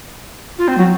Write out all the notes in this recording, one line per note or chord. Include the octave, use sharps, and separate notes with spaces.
F4
C4
F#3